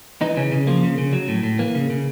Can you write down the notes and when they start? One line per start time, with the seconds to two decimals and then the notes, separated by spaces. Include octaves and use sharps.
0.21 E3 D#4
0.37 C#3 C#4
0.52 C#3
0.67 F3 A#3
0.83 C#3
0.98 C#3
1.13 F#3
1.28 A2
1.43 A2
1.59 E3 A#3
1.75 C#3
1.90 C#3